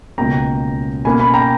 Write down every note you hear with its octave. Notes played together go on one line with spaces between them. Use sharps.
C#2 B2 A#3 C#4 G5 A#5
B2 A#3 C#4 G#5 B5
G#5 B5
G5 A#5